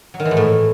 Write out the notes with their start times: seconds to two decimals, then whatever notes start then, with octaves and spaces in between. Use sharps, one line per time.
0.14 F#3
0.20 D#3
0.25 E3
0.31 G#2
0.37 A2